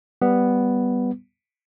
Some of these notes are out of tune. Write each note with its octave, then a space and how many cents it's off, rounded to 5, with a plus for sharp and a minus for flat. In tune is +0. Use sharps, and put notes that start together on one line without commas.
G3 +0 B3 +0